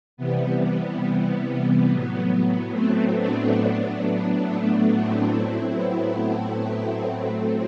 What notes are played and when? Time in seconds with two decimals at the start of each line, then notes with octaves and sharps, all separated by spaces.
0.17 C3 E3 G3 B3
0.60 B3
1.88 A2 F#3
2.72 A3 C4
3.15 B3 D4
3.58 A2 F#3
4.42 A3
4.72 B3
5.00 A3 C4
5.28 A2 F#3 C4 E4
5.71 B3
6.13 A3
6.55 B3
6.98 A2 F#3 A3 C4
7.27 A3 C4